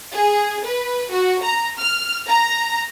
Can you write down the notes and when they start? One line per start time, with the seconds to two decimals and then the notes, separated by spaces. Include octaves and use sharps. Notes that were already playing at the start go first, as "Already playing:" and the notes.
0.14 G#4
0.65 B4
1.11 F#4
1.42 A#5
1.78 F6
2.28 A#5